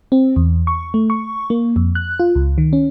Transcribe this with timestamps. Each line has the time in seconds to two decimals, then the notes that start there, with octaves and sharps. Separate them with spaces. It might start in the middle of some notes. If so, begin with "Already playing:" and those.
0.12 C4
0.36 E2
0.67 C#6
0.94 A3
1.10 C#6
1.50 A#3
1.76 F2
1.95 F#6
2.20 F4
2.35 C#2
2.58 D#3
2.73 C#4